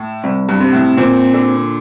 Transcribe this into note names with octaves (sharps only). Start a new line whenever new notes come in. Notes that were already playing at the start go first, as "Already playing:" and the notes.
Already playing: A2
C2
G2
C3
A2
A#2 C4
D3